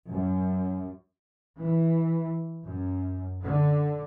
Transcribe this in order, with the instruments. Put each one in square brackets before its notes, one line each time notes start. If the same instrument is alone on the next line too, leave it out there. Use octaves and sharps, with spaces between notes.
[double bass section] F#2
E3
F#2
D3